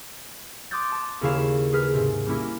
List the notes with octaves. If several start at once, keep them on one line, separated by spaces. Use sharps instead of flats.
C6 D6 D#6 F#6 G6 A6
A5 A6
D#2 C#3 E4 F5 E7
G#4 B4 F6 B6
G#2 C3
G3 A#3 C#4 E4